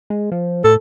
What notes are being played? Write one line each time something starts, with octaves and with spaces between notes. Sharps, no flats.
G#3
F3
A2 A4